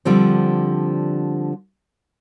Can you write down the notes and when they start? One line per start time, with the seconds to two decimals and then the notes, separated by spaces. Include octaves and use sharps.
0.05 D3 F3 G3 C4